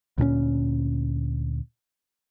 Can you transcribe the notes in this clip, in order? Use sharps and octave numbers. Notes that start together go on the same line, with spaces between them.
D2 A#2 B3 C#4